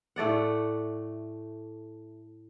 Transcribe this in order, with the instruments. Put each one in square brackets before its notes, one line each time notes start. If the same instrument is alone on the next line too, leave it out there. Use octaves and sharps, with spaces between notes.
[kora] A2 A3 D5 F#5